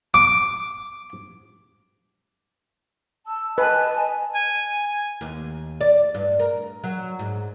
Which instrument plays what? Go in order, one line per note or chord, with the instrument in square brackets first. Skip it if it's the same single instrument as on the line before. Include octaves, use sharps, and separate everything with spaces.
[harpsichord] D6
[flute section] A5 E6
[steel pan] B4 [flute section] D#5 G#5 A5
[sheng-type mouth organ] G#5
[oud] D#2
D5
G2
A#4
F#3
G#2